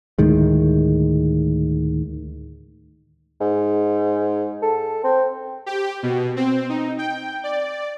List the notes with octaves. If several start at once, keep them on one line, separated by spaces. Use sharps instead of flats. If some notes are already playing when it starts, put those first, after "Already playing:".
D2 A2 D#3 G#3
G#2
A4
C4
G4
B2
C4
D#4
G5
D5